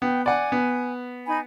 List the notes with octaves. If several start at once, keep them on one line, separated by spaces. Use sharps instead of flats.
B3 G5
D5 F#5 G#5
B3
D#4 G#5 B5